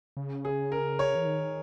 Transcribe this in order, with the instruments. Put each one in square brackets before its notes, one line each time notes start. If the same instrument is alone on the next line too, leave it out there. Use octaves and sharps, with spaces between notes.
[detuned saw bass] C#3
[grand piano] G#4
A#4
C#5
[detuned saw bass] E3
D#3